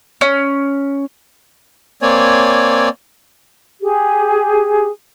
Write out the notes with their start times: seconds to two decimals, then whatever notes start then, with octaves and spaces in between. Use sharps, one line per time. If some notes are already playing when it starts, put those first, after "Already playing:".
0.21 C#4
2.02 A#3 C4 C#5 D5 G#5
3.82 G4 G#4